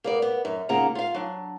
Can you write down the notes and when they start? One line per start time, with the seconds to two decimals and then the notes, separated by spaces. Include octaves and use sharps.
0.04 A#3 B3 D5
0.22 B3
0.45 F#2
0.69 D#2 C#3 A#3 F4 F#5 A#5
0.95 F4 F5
1.14 F#3 D4